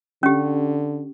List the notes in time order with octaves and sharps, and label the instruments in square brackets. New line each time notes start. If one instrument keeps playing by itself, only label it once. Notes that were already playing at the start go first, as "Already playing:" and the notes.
[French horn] D3 [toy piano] C#4 G4